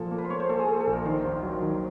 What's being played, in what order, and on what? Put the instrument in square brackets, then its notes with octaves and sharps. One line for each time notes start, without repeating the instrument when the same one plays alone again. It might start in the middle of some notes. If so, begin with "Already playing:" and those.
Already playing: [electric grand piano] A#2 F3 A#3 [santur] A4
[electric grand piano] A#3
[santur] B4
C5
[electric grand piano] A#3 [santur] C#5
[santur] C5
[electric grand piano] A#3 [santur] A4
[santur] G#4
[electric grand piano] A#3 [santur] A4
[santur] A4
[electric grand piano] A#1
[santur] A#4
[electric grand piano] D#3 [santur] C5
[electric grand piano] D#2
F#3
D#3